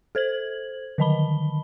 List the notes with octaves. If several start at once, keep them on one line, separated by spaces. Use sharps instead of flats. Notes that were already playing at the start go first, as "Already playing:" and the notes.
A4 C5 G#6 F#7
D3 D#3 D#5 A5 B5 G7